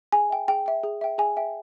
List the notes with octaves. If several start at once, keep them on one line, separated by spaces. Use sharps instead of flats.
G#4 G#5
E5 G5
G#4 G5
E5 G5
G#4
E5 G5
G#4 G#5
E5 G5